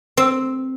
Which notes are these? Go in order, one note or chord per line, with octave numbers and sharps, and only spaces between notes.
C4